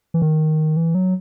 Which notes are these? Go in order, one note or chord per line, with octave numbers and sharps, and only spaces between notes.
E3
D#3
E3
F#3